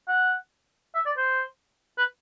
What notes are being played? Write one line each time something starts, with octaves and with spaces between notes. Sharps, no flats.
F#5
E5
D5
C5
B4